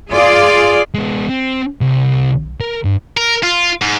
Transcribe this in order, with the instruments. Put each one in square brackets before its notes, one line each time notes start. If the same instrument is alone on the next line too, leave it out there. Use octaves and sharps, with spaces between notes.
[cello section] F4 G#4 D5
[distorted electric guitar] G#3 B3
C4
C2
A#4 A#5
G2
A#4
F4
G#2